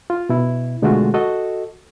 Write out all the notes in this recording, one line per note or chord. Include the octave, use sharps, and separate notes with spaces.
F4
B2 E4
B2 D3 G#3 A3 F4 F#4
F#4 A4 D#5